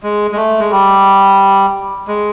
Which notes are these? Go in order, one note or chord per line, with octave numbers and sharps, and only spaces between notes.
G#3
G#3
A3
G#3
G3
G#3